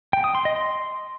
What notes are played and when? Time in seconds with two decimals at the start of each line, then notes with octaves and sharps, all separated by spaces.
0.13 G5
0.24 D#6
0.35 C6
0.45 D#5
0.56 C6